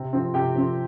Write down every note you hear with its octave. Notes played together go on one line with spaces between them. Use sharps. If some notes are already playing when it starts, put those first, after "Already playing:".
Already playing: C3
F3 C4
C3 G4 G5
F3 C4